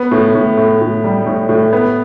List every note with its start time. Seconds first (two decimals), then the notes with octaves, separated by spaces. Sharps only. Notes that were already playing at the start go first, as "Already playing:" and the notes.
Already playing: B3
0.11 A2
0.35 A2
0.57 A2
0.81 A2
1.04 G3
1.26 A2
1.49 A2
1.73 B3